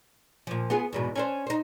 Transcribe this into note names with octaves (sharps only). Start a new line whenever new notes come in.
A#2 F3
B3 F4 G#4
E2 G#2 B2
C#4 D4 C5
D#4 C5